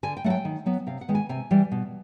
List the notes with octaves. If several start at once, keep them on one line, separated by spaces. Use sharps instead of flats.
D3 G#5
G5
F#3 A3 F#5
G5
D#3
F#3 B3
C3 F5
F#5
D#3 G#3 B3
G#5
C3 G#5
E3 G3
B2